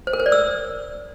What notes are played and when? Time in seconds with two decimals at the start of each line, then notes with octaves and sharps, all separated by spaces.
0.07 C5
0.13 A#4
0.20 C5
0.26 D5
0.32 E6